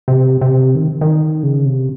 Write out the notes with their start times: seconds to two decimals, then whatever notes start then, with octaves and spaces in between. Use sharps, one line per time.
0.08 C3
0.41 C3
0.75 D#3
1.01 D#3
1.43 C#3
1.66 C3